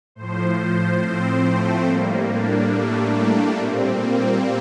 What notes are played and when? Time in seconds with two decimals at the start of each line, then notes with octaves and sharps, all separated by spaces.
0.15 A2 F3 C5
1.01 C4
1.44 A3
1.86 A2 G3 A#3
2.29 D4
2.72 A3
3.14 A#3
3.57 A#2 G3 C4
4.00 A#3